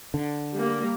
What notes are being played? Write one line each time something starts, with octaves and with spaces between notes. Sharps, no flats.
D3
G3 A#3